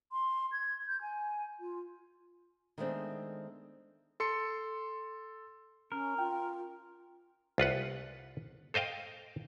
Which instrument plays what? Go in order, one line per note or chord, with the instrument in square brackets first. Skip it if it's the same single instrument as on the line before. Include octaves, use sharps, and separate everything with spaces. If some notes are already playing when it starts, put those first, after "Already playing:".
[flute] C6
G#6
G6
G#5
F4
[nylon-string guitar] D#3 G#3 A3 B3 C4 D4
[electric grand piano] A4 C6 C#7
[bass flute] C#4 [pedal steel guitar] A#4
[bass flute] F4 [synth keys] G5
[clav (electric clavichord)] C2 F4 B4 F#5
A4 C5 D#5 F5 G5